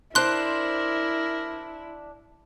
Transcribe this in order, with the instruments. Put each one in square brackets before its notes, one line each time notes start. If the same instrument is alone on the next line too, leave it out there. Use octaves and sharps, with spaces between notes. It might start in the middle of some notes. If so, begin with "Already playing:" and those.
[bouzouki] D4 C5 [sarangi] E4 [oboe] A#4 [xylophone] C6 F#6